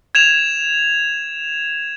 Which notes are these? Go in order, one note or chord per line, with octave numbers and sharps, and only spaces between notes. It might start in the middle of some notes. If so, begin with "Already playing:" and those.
G#6 E7 F7